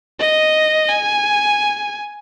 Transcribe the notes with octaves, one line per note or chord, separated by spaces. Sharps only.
D#5
G#5